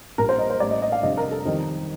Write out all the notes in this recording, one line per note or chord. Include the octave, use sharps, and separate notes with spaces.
A#1 A#2 G3 A#4
C5
D#5
C5
A1 A2 G3 D5
D#5
D#5
F5
F1 F2 D3 G3 D#5
A#4
A4
F2 D#3 G3 D#4